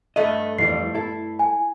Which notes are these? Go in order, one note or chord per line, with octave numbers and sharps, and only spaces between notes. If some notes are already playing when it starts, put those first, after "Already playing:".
G2 A3 D#5
F2 E3 G3 C7
E4 A4
G#5